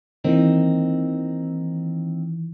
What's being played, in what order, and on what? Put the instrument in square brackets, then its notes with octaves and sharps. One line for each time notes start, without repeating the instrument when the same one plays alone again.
[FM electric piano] D#3 E3 [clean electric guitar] A#3 C4 D#4